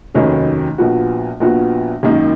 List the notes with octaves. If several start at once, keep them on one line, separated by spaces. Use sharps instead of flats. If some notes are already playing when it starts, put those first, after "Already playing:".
F1 D#2 D#3 F#3 C#4
A#1 A#2 F3 B3 F#4
A#1 A#2 F3 B3 F#4
G#1 F#2 D#3 A#3 D#4